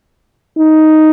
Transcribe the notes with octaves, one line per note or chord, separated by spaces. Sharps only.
D#4